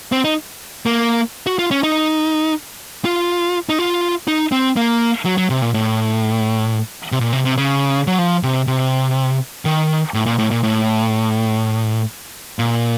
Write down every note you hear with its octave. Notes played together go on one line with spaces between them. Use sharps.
C4
D#4
A#3
F#4
F4
C#4
D#4
F4
D#4
F4
D#4
C4
A#3
F#3
F#3
C3
A#2
A2
C3
A#2
C3
C3
C#3
F#3
F3
C3
C3
D#3
A2
A#2
A2
A#2
A2
A#2